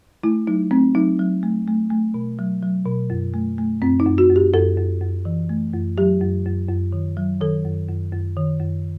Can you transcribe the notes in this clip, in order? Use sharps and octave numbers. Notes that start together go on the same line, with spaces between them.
A3 E4
F#3 D#4
A3 C4
F#3 D#4
F#3
A3
A3
A3
B2
F#3
F#3
B2
F#2
A3
A3
F#2 C4
D#4
F#2
F#4
F#2
G4
F#2 A4
F#2
F#2
E3
A3
F#2
F#3 G4
F#2
F#2
F#2
D#3
F#3
D#3 A4
F#2
F#2
F#2
D#3
F#2